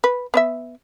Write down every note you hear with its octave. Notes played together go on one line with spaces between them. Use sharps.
B4
B3 D5 E5